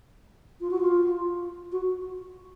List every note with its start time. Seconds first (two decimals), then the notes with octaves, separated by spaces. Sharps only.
0.61 F4
0.70 F#4
0.81 F4
1.72 F#4